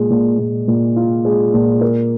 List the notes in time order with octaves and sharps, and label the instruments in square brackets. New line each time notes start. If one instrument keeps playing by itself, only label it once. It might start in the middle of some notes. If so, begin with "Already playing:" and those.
Already playing: [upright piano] A#2 G#3
A#2
A#2
A#2
F4
G#3
A#2
A#4